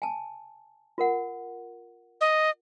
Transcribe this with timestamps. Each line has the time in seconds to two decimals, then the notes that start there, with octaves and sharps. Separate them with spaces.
0.02 G#5 A5
0.98 F4 A#4 F#5
2.21 D#5